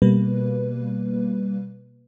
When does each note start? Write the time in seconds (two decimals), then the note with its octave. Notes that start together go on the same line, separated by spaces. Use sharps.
0.02 B2 G3 A#3 B4